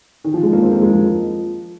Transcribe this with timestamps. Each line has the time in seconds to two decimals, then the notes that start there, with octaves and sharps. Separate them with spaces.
0.24 D#3
0.34 F3
0.43 G#3
0.53 A#3
0.62 C4
0.72 A#3
0.81 G#3
0.91 F3